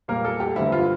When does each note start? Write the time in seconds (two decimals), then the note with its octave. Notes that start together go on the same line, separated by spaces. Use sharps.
0.08 A#2 G3 A#3 A#4
0.25 A4
0.40 G4
0.56 G2 D3 G3 C4 E4
0.72 F4